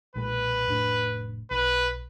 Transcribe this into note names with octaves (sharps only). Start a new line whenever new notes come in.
B1 A#2 G#3 B4
F1 A2 D4
B1 B4